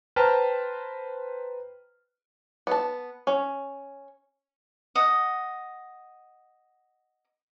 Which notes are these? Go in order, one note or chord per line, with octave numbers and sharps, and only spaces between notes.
B4 C5 G5 A5 A#5 F6
B3 A5
C#4
D#5 F#5